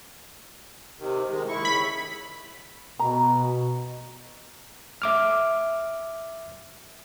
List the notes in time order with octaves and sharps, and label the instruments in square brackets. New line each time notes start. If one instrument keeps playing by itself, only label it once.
[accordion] C3 D#3
D#3 G#3
D#2 E4 C#6
[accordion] C#3 [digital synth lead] B5
[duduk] B2 [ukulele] A#5
[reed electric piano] E5 D6 F6